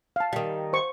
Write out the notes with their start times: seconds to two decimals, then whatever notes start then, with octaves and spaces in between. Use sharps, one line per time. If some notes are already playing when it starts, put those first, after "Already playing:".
0.16 F5 A5
0.33 D#3 G3
0.73 C5 C#6